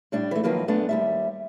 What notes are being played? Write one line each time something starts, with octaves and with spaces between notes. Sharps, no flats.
A2 G3 D4
E3 A3
D#3 F3 F#3 A#3 B4
F#2 A3 B3 D4
D#2 G3 E5